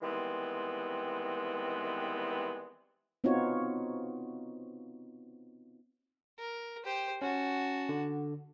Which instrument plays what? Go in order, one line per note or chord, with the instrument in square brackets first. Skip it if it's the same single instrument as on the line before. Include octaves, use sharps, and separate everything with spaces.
[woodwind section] D#3 E3 G3 G#3 B3 C4
[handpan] B3 C4 D#4 F4 F#4 C#5
[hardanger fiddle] A#4
G4 C5
[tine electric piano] C#4 [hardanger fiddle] F#4 A5
[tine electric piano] D3